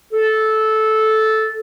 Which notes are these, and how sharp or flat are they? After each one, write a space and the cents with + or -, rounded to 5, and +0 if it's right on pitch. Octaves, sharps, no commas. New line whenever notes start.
A4 -10